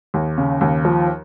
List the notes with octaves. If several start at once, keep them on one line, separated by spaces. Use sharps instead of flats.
D#2
C#3
D#2
F3